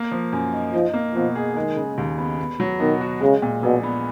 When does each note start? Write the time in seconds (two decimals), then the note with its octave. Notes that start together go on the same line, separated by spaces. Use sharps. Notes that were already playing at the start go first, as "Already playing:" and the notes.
Already playing: A#3
0.12 F3
0.33 F#2
0.53 D#4
0.73 F3 D#4
0.94 A#3
1.15 B2 F3
1.35 G#4
1.56 D#3 G#3
1.76 C#3
1.98 D#2
2.18 B3
2.39 B3
2.60 F#3
2.80 B2 D#3
3.01 F#4
3.21 C#3 G#3
3.42 A#2
3.63 A#1 B2
3.83 B3